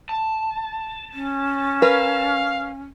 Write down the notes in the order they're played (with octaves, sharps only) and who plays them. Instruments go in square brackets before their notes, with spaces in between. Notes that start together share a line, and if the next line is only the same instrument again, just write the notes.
[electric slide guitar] A5
[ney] C#4
[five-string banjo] A#4 B4 [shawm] F5